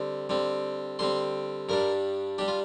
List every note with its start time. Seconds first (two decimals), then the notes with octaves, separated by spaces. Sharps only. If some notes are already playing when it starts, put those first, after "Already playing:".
Already playing: D3 G3 C4
0.29 D3 G3 C4
0.99 D3 G3 C4 C6
1.69 G2 G3 D4 A#4
2.38 G3 D4 G4
2.48 F4